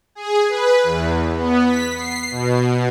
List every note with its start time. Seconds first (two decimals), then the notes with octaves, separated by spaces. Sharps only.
0.15 G#4
0.48 B4
0.83 E2
1.35 B3
1.66 B6
1.95 C7
2.31 B2